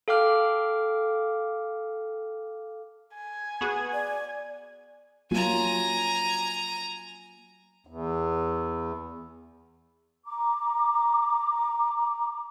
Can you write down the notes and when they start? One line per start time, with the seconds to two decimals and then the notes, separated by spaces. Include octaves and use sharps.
0.08 A4 F5 G5 D6 F6
3.15 G#5
3.61 B3 F#4 G#4
3.93 D5
5.31 F#3 A#3 F4 G#5 A#5
7.87 E2
10.26 A#5 D6